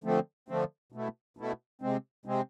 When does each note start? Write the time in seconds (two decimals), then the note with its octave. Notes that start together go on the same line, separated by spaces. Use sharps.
0.04 D3 F3 A3 C4
0.49 D3 F3 A3 C4
0.92 B2 A3 E4
1.37 B2 A3 E4
1.82 C3 G#3 C4
2.25 C3 G#3 C4